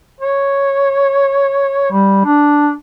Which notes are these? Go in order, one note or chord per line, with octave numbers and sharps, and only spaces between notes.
C#5
G3
D4